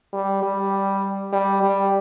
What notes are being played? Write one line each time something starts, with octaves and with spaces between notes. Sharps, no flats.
G3
G3
G3
G3